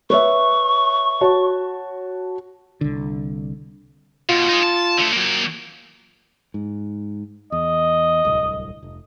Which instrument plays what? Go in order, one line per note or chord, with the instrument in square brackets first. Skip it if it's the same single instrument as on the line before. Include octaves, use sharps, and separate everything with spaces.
[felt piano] B4 C#5 E5 [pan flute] C#6
[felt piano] F#4 C#5 A5
[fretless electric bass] C2 D3
[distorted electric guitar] B2 [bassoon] F4
[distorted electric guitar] D#4 G#4
A5
D3 A3
F#3 A#3
[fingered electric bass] G#2
[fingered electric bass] E2 [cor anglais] D#5
[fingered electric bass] D1 C2
F1